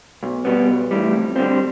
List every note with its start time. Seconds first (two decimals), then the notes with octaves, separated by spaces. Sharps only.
0.23 B1
0.45 B2 G3 B3
0.68 B1
0.91 A2 E3 G3
1.14 F2
1.36 D3 G3 C4